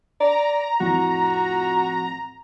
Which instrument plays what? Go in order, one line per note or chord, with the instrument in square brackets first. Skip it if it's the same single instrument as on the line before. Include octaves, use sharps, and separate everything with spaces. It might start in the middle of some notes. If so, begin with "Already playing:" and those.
[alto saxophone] D5 [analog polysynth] A#5
[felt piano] F2 A2 [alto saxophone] F#4